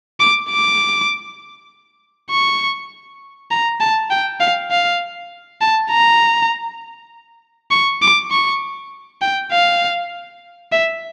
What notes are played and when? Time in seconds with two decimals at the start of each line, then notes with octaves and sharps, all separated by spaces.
0.20 D6
0.50 D6
2.30 C#6
3.51 A#5
3.80 A5
4.11 G5
4.40 F5
4.71 F5
5.61 A5
5.91 A#5
7.71 C#6
8.02 D6
8.31 C#6
9.22 G5
9.52 F5
10.72 E5